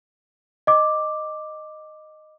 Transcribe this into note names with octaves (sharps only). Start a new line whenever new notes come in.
D#5 D6